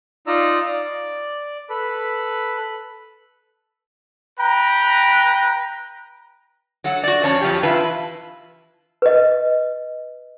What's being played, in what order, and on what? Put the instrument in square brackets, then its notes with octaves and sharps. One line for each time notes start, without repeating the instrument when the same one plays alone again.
[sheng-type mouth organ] D#4 F4 D5 A#5 E6
D5
A4 B4 B5
[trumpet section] B4 G5 A#5
[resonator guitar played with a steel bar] F#3 A4 F#5
F#4 D5
F2 C#4 C#5 A5
F2 F3 F#3 G4
E3 E4 F4 B4 A5
[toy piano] B4 D#5